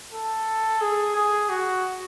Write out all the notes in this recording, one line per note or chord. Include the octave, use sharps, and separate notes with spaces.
A4
G#4
G#4
F#4